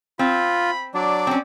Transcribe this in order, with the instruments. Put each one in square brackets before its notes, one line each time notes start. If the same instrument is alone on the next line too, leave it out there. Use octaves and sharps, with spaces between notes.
[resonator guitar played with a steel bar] C4 [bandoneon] F4 [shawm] B5
[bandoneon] F#3 D4 [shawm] D5
[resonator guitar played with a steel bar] C4 C#4